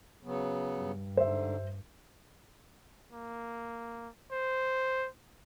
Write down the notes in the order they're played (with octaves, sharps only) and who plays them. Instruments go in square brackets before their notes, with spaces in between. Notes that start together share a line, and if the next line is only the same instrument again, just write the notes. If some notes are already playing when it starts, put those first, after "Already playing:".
[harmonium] C#3 F#3 B3
[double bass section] G2
[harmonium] G#2 D3 [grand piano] C5 E5
[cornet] A#3
C5